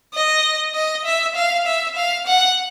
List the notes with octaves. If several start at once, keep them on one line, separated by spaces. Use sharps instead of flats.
D#5
D#5
E5
F5
E5
F5
F#5